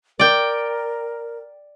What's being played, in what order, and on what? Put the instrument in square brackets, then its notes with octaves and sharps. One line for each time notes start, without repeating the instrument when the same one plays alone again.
[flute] A#4 [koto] D5 G5